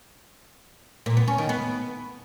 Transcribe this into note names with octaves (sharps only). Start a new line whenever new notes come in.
A#2
B3
C#4
D#3
B3